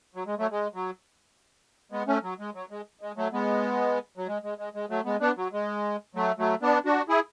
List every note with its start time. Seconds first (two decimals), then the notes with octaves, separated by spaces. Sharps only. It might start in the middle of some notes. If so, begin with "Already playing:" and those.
0.15 F#3
0.27 G#3
0.39 F#3 A3
0.51 G#3
0.74 F#3
1.92 G#3 B3
2.07 A3 C#4
2.23 F#3
2.39 G#3
2.55 F#3
2.71 G#3
3.01 G#3
3.17 F#3 A3
3.33 G#3 B3
4.17 F#3
4.27 G#3
4.43 G#3
4.58 G#3
4.75 G#3
4.89 F#3 A3
5.05 G#3 B3
5.21 B3 D4
5.37 F#3
5.53 G#3
6.15 F#3 A3
6.38 F#3 A3
6.62 B3 D4
6.85 D4 F#4
7.09 E4 G#4